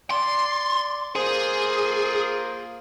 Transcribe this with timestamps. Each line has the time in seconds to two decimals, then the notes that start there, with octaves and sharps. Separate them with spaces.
0.11 D5 C6
1.16 A#3 F4 G#4 C5